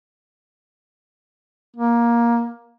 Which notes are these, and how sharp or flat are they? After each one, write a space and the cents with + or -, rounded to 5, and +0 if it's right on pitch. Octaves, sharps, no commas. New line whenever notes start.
A#3 +15